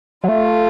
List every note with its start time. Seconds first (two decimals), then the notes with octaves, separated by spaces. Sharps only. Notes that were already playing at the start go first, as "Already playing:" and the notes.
0.24 F#3
0.28 A3 F4